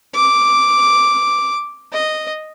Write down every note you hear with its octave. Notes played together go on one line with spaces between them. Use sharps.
D6
D#5